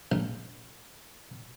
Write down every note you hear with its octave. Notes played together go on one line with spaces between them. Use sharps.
A#1